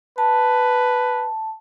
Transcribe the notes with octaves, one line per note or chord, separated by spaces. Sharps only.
B4 A5